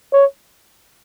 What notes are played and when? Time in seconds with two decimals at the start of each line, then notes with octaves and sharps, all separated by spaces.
0.13 C#5